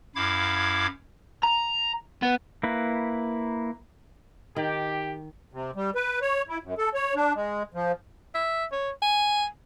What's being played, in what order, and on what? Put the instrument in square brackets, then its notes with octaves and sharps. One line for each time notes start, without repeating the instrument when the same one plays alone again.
[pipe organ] F#2 E4 F5 D6 G#6
[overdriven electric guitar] A#5
B3
[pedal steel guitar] A#3 E4 B4
[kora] D#3 [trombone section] G4
[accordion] C3
G3
B4
C#5
E4
F#2
A4
C#5
D4
G#3
F3
[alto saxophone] E5
C#5
G#5